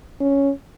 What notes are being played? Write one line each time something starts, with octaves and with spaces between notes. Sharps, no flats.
C#4